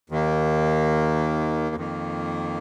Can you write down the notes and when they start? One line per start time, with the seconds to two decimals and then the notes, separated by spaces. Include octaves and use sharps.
0.10 D#2 D#3 A#3
1.75 F2 D#3 A#3